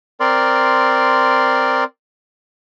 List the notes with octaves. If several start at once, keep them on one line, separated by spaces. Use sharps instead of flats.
C4 A#4 D5 C6